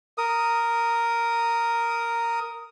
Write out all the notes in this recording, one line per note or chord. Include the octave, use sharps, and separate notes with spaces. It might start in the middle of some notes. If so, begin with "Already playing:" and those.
A#4 D#6